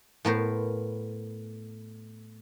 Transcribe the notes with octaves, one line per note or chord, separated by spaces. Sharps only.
A2 B3 A#4 C5